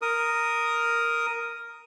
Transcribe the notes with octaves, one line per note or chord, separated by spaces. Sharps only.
A#4 D#6